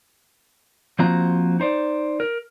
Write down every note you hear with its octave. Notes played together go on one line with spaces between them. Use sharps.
F3 A#3 C4 F4 F#4 A#5
D#4 C5 D5
A#4